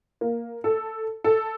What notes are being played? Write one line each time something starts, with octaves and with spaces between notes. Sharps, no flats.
A#3
A4
A4